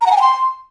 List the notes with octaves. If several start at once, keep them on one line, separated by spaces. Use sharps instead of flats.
A#5
F#5
G#5
G5
C6